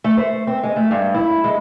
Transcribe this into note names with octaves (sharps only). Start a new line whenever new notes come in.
A3
C5
C4
G#3
A3
G2
E4
G#3